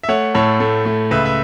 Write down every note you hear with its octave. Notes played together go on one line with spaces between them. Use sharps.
E5
A3 C#5 F#5
A2 A4 C#5
A3
A3
C#2 B4 E5
E5